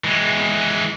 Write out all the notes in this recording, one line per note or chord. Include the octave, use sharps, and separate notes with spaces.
E3 G#3